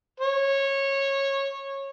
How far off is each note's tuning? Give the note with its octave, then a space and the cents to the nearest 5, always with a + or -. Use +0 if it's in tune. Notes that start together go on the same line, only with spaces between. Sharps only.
C#5 -15